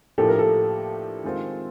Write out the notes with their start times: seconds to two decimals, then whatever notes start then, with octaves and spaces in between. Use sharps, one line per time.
0.18 A2 F3 A#3 D4 G4 A4
0.29 A#4
0.39 A4
1.24 D#3 G#3 C4 F4 A#4